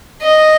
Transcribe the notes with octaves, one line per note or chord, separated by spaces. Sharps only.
D#5